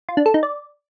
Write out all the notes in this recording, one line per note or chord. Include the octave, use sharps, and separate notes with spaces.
F4
D4
A4
D#4
D5